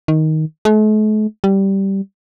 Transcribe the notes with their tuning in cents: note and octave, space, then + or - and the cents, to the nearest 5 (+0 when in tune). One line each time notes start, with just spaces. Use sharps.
D#3 +10
A3 -45
G3 -10